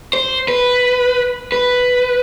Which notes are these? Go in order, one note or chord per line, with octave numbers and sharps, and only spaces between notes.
C5
B4
B4